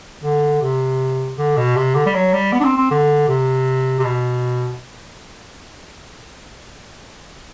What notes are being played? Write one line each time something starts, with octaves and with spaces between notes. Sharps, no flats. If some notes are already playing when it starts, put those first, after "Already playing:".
D3
C3
D3
B2
C3
D3
G3
F#3
G3
B3
D4
C4
C4
D3
C3
C3
B2